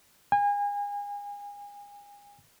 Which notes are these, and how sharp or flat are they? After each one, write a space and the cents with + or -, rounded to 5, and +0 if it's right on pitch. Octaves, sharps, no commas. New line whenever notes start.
G#5 -35